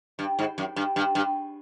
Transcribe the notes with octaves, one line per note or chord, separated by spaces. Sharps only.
G2
G#2
F#2
G2
G2
G2